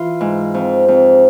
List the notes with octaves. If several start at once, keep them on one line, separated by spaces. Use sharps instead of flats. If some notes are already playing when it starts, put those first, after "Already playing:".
Already playing: E3 F4
G#2
F2
F2